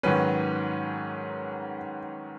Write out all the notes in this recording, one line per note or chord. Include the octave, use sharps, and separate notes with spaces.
G#2 D#3 F#3 C#4 B4